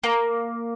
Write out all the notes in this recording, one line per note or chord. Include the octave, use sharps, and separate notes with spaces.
A#3